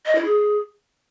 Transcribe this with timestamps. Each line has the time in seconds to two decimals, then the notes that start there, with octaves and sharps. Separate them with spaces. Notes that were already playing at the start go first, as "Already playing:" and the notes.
0.06 D#5
0.15 E4
0.25 G#4